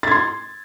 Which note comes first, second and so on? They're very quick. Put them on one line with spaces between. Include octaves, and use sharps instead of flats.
A6 G#6 C6